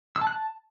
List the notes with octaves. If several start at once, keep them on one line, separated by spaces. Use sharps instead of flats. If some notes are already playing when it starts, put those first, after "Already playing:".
E6
A5
F#6
A5